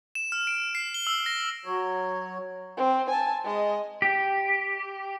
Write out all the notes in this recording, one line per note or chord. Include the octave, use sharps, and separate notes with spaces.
E7
F6
D7
C7
G7
E6
A#6
F#3 C#5
C4
G#5 A5
G#3 D#5
G4